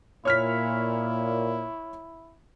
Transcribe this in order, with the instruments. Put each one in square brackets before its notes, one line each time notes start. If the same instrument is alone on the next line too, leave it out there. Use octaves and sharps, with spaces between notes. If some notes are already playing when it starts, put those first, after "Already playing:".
[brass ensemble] A#2 [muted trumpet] E4 [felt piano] C#5 F6 B6